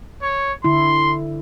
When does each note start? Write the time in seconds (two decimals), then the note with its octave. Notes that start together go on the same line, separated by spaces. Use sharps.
0.22 C#5
0.64 D3 E4 C6